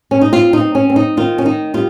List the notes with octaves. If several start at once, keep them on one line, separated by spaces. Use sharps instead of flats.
C#4
D#4
C4 F4
D#4
C4
C#4
C4
D#4
D#3 F4
C#4
D#3 D#4
G3 F4